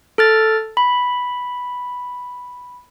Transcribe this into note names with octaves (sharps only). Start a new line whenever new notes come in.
A4 F6 A6
B5